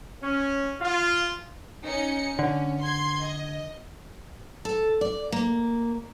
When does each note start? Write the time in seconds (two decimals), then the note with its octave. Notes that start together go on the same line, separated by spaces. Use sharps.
0.22 C#4
0.81 F4
1.83 C#4 D#4 C#7
2.39 D3 C#4
2.83 C6 G#6
3.25 D#5
4.65 A4
5.01 D5
5.32 A#3